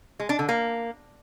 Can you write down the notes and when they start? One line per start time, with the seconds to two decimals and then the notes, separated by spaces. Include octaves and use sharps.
0.20 G#3
0.29 D4
0.39 D3
0.49 A#3